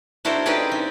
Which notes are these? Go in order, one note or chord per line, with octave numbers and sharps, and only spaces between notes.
D4 E4 F#4 A4 A#4 C5
C#4 D#4 G4 G#4 B4 D5
C4